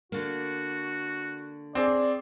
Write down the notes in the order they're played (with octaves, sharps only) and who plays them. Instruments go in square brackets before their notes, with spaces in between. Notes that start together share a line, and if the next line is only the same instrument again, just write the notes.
[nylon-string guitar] D3 A#3 [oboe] F#4
[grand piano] C4 G#4 [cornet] D5